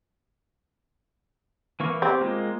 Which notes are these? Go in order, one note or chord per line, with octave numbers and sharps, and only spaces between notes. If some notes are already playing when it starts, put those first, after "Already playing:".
E3 A#3 C#6
C4 G4
G#3 A#3 F4